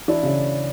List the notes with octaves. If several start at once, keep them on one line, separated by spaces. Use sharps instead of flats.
E3 D4 E4
C#3